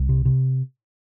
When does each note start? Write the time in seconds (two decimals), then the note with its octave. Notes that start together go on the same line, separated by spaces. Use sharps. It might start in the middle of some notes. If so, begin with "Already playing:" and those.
Already playing: C2
0.09 C3
0.25 C3